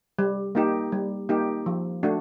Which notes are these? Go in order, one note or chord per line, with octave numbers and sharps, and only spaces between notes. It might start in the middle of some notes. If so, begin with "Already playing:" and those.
G3
A#3 D#4 G4
G3
A#3 D#4 G4
F3
A3 D4 F#4